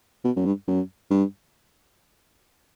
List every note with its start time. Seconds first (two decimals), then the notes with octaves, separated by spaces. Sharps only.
0.24 B2
0.36 F#2
0.46 G2
0.68 F#2
1.11 G2